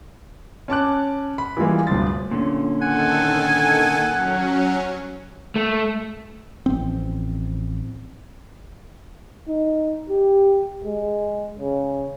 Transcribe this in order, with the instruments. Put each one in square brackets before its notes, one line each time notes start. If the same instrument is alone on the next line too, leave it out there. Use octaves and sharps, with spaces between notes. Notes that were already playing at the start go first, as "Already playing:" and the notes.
[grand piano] C#4 A5 D6 F#6
B5
E3 F3 G3 G#3 A#3
D1 G2 C6 A6
[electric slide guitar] A#2 D3 C#4
[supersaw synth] D#3 A4 [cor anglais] F#5 [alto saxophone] G#5
[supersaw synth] F#3 C#4
[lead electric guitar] A3
[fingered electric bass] A1 F3 C4
[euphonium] D#4
G4
G#3
C#3